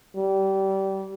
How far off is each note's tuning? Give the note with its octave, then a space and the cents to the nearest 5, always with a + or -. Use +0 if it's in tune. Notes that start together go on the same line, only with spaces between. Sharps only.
G3 -25